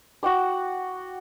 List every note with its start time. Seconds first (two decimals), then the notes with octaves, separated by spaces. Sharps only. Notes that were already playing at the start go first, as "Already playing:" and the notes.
0.23 F#4 F#5 G5 D6